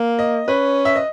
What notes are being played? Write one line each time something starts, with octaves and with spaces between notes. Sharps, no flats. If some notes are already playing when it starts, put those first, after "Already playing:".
Already playing: A#3
D#5
C#4 B4
E5
D#5